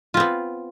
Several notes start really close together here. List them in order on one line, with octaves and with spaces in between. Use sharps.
F4 C4 B3